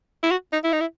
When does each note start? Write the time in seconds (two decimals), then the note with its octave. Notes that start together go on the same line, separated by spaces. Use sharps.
0.23 E4
0.31 F#4
0.52 D#4
0.64 E4
0.72 D#4
0.80 E4